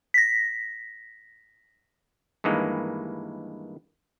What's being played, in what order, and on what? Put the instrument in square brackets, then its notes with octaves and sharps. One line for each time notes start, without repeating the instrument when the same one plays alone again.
[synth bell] A#6 B6
[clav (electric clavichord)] G2 D#3 E3 G#3 A#3